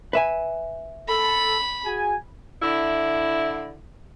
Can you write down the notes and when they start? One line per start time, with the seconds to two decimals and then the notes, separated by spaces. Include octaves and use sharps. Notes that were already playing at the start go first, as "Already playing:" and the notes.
0.13 B4 E5 G#5
1.09 A4 B5
1.85 F#4 G#4 G#5
2.62 D3 E4